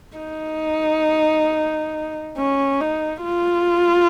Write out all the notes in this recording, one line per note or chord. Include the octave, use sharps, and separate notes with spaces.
D#4
C#4
D#4
F4